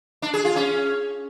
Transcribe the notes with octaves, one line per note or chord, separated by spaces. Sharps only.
D4
G#4
F4
C#4